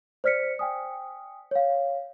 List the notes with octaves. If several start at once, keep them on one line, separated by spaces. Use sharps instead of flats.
C5 D5 F6 B6 C#7
G5 G#5 D#6
C#5 F5